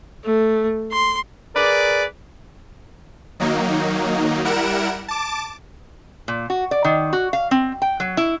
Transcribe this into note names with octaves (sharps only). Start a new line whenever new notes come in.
A3
C6
G#4 A#4 B4 D5
D#3 F#3 A#3 D#4
G3 E4 A#4 F#5 D7 E7
A5 D6
A#2
F#4
D5
D#3
F#4
F5
C4
G5
F#3
E4